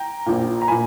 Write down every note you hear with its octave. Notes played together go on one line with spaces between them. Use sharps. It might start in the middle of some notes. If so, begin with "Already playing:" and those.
Already playing: G5 A#5
A#1 A#2
A#5
A#2 G#5 B5